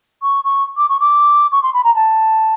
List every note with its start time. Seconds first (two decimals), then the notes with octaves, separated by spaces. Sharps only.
0.22 C#6
0.44 C#6
0.77 D6
0.89 C#6
1.00 D6
1.52 C#6
1.63 C6
1.74 B5
1.84 A#5
1.95 A5